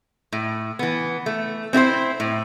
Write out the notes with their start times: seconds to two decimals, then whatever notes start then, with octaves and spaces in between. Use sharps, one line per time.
0.32 A2
0.79 E3 B3
1.26 A3
1.73 C4 E4 G4 C5
2.20 A2